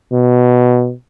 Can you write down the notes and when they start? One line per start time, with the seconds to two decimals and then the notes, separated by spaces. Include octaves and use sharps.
0.12 B2